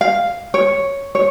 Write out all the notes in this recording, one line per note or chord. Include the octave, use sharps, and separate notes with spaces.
F5
C#5
C#5